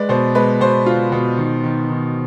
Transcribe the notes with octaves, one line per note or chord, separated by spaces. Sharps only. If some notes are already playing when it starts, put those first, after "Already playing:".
Already playing: G#3 B4 D5
B2 C5
G#3 B4
B2 C5
F4
B2
D#3
D#3
D#3